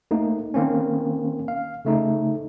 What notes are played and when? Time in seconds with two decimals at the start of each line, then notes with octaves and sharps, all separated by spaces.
0.11 A3 A#3 D#4
0.54 D#3 A#3 C4 C#4
1.48 F5
1.85 C#3 A3 D#4